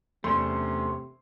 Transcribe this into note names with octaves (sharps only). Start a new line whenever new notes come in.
E2 C3 A3 C#4 D4 C6